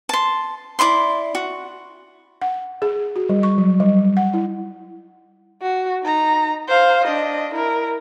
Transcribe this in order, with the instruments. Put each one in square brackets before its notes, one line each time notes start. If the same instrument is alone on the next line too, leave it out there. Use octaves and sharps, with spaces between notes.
[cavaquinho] A5 C6
E4 D5 B5 C6
F#4
[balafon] F#5
G#4
F#4
G3
C#6
F#3
G3
F#5
E4
[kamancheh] F#4
D#4 A#5
C5 F5
D4 D#5
E4 A#4